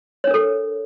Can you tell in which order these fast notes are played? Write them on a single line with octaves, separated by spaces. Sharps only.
C#5 D4 A#4 A4